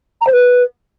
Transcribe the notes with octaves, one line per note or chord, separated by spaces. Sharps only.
A#5
C5
B4